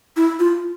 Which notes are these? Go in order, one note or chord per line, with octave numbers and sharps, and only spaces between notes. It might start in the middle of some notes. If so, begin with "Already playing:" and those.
E4
F4